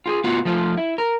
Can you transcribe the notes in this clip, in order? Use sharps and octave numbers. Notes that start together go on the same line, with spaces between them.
F4 G4 G#4
A2 B3 F4 F#4
F3 A3 F4
E4
A#4